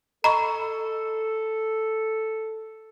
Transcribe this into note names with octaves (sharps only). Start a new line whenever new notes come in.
A4 D#5 A#5 B5 C#6